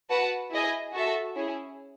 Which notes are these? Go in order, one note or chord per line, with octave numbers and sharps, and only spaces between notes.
F#4 B4 F#5 A5
E4 G#4 D#5 G#5
F#4 A4 E5
C#4 E4 G#4